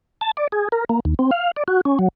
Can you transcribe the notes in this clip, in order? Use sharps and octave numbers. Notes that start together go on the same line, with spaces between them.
A5
D5
G#4
A#4
A#3
D#2
C4
F5
D5
F#4
C#4
F#3